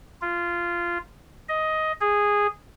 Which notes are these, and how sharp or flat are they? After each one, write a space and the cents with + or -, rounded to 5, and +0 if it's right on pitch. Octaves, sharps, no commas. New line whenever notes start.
F4 -15
D#5 +10
G#4 -10